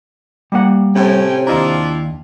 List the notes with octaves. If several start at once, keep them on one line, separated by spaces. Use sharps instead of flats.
G3 A#3 F#5
A2 C3 C#4 G5
D#2 D4 E4 F4 D#5 A#5